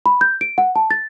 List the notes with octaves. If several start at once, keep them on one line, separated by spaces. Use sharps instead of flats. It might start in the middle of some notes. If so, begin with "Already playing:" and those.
B5
G6
D7
F#5
A5
A6